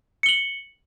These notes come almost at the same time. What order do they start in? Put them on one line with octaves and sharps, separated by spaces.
C#7 G7 F#7